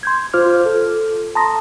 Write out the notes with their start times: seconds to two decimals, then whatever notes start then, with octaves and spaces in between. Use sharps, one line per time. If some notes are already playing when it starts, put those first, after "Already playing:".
0.03 C6 G6 G#6
0.34 F4 C5 D6 F6
0.66 A4
1.35 A5 A#5 C6 D#6 A#6